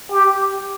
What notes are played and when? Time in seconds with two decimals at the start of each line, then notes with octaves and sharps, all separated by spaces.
0.11 G4